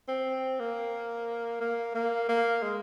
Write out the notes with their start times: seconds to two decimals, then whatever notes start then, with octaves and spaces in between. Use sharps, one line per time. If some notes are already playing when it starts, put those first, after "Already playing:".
0.08 C4
0.59 A#3
1.61 A#3
1.95 A#3
2.29 A#3
2.62 G#3